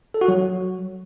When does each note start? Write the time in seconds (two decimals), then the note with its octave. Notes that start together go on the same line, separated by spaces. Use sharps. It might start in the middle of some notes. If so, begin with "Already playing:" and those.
0.14 A4
0.21 F#4
0.28 F#3